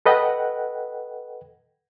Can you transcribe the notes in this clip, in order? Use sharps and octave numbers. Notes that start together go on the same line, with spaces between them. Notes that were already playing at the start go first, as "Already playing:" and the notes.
A4 B4 D#5 F#5 G5